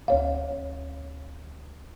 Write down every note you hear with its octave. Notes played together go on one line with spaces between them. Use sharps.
D2 C#5 F5